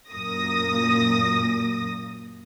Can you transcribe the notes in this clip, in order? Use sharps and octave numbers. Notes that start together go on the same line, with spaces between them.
F#2 A#2 A#3 D#6 A#6